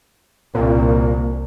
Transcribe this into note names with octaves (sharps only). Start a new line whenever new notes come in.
C2 A#2